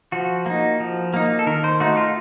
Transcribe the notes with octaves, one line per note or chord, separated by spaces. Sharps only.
F3 F#4
A#3 D#4
F3
A#3 D#4
A4
D#3 A#4
C5
A3 D#4 F#4
F4